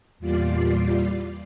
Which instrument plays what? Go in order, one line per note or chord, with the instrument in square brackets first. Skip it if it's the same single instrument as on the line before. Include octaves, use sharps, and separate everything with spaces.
[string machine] E2 A#2 G3 F4 D5 C7